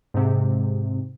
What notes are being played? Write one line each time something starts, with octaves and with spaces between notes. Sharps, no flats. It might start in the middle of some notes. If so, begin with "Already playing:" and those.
G#2 C3